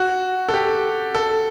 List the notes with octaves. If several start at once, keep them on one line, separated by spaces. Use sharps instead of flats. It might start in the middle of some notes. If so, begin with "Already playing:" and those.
Already playing: F#4
A4
G4
A4